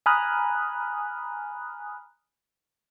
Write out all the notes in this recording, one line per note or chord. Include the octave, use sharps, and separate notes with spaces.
G#5 A#5 B5 D#6 F6 F#6